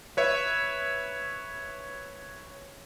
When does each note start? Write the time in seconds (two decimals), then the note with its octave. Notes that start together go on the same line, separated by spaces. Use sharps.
0.17 B4 C#5 E5